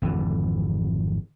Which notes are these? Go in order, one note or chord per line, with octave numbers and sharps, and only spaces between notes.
G#1 F2 D3 E3